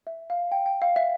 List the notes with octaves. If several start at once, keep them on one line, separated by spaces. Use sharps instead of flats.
E5
F5
G5
G5
F5
E5